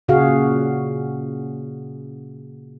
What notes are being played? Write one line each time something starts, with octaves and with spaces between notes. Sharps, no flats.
A#2 C#3 F#4 G#4 F5